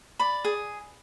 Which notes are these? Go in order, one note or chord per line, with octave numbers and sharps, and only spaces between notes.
D5 B5
G#4